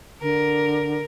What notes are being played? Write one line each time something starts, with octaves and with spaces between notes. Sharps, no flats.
D3 A#4